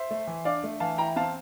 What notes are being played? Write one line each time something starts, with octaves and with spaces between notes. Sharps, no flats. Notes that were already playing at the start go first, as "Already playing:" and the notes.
Already playing: C5 E5
A3
E3
D4 D5 F5
A3
E3 F5 A5
E4 G5 A#5
C4 F5 A5